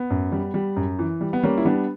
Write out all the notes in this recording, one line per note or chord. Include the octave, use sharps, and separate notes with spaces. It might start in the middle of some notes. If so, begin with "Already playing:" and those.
Already playing: B3
F#2
G3
G3
F#2
E3
G3
B3
G3 A#3 C#4
E4
G3 B3 D4